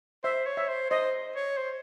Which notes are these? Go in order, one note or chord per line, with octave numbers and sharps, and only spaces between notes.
C5 E5
C#5
E5
C5
C5 D#5
C#5
C5